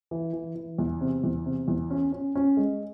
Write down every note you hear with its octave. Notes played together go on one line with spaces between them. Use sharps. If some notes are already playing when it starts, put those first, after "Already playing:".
E3
E3
E3
E2
C3
E2
C3
E2
C#4
C#4
C#4
G#3